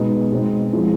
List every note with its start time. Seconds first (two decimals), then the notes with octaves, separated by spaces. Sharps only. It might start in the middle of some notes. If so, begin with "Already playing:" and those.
Already playing: B2 G#3 B3 D#4
0.32 B2 G#3 C4 D#4
0.73 F3 G#3 C4 E4